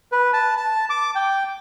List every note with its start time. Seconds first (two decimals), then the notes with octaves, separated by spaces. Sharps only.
0.12 B4
0.33 A5
0.57 A5
0.90 D6
1.15 G5